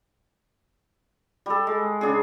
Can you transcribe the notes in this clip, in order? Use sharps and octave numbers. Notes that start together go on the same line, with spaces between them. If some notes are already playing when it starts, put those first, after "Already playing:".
G3 A4
G#3
C#3 D4 G#4